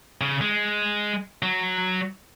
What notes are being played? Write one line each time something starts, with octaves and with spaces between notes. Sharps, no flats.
C#3
G#3
F#3